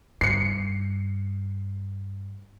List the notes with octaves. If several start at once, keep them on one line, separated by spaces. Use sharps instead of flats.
G2 C7 C#7